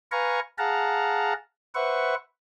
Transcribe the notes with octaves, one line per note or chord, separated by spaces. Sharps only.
B4 F5 G#5 A#5 C#6
G#4 F5 F#5 A5 A#5
B4 C5 E5 F#5 C#6